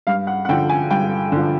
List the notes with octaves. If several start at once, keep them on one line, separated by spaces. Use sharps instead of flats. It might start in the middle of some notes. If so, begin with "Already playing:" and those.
G2 F5
F#5
F#5
D3 F3 G5
G#5
G2 G5
D3 F3